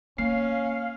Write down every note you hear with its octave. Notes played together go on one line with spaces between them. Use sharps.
A#3 C#4 F5 C7